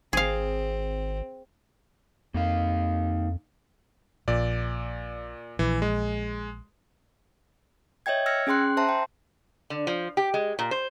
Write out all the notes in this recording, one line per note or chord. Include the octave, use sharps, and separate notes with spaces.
G#1 C4 G#4 F5
F2 A#3 D#4 F5
A#1 A#2 D5
A#1 E3
G#3
C#5 D#5 E5 G5 G#6
E6 F6 G#6 A#6 C#7
C#4 G#4 G5 C6 F#6
C5 E5 A5 A#5 C6
G5
D3
F3
G4
G#3
A#2
C5